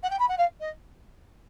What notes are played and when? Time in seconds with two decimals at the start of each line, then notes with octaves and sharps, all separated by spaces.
0.03 F#5
0.10 G5
0.19 B5
0.28 F#5
0.38 F5
0.60 D#5